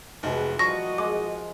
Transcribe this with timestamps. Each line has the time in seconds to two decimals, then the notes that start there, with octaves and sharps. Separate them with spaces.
0.23 F1 E3 F3 G#3 F#4 B4
0.59 F3 G3 F#4 A#4 D#5 C#6 A#6
0.98 G#3 D6